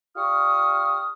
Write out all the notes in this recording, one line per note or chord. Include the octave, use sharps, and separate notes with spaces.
F4 G4 D5 C#6 D#6 F6